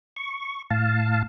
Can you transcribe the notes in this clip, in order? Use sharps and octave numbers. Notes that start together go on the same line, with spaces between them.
C#6
A2 F5 A5